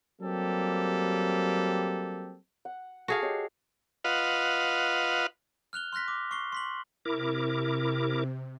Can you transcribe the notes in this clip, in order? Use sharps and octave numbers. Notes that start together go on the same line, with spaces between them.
F#3 G3 A#3 C4 G4 A4
F#5
F#4 G#4 A4 F5
G4 C#5 D#5
F4 B4 D#5 F5 F#5
F6 F#6 F7 G7
C6 F6 F#6 A#6 B6
D6
C#6 C7 G7
C6 B6 F#7
C3 E4 A#4 D6